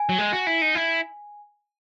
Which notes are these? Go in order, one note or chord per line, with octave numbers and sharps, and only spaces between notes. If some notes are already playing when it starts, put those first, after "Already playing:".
Already playing: G#5
F#3
G#3
F#4
E4
D#4
E4